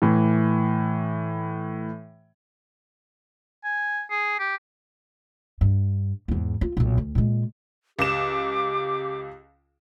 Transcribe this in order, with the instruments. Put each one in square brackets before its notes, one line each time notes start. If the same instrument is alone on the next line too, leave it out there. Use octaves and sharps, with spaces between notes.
[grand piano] A2 E3
[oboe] G#5
G#4
G4
[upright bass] G2
E2 G#2
F4
B1 A#2
D2
A#2 G#3
[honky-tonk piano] C#2 E7 [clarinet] G4 [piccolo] D6